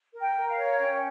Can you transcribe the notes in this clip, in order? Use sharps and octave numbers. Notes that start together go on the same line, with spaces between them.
A#4
G5
A#4
F5
C#5
C#4 G5